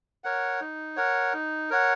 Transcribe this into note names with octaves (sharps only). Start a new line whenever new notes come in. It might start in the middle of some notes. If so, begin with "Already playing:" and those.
A#4 C#5 F#5
D#4
A#4 C#5 F#5
D#4
A#4 C#5 F#5